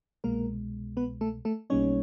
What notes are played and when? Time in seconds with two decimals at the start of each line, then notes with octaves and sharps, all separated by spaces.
0.24 C2 B2 G#3 A#3 A#4
0.97 B3 B4
1.21 A3 A4
1.45 A3 A4
1.70 B1 B2 G3 A#3 C#4 D#4 C#5